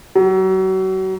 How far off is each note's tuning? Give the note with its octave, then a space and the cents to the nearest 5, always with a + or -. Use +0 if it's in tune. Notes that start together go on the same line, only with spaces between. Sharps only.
F#3 +35